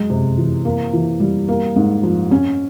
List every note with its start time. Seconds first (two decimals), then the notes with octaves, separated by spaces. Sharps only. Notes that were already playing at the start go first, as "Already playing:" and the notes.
Already playing: F#3 G#3
0.10 C3
0.38 E3
0.65 A#3
0.93 E3
1.20 G3
1.48 A#3
1.76 G#2
2.03 F3
2.31 C#4